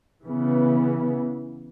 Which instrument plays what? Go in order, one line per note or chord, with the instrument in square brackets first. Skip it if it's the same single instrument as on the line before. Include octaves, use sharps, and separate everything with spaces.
[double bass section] C#3 E3 B3